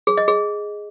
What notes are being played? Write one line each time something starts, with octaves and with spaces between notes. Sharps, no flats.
G#4
D#5
G#4